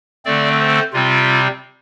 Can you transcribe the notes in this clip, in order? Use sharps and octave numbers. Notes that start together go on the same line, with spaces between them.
D3 A3 C4 D5
C5
C3 G3 C4 F4